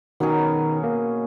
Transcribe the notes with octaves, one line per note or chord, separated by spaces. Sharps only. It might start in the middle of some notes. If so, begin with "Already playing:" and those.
B2 D#3 F#3 C#4 G#4
A#3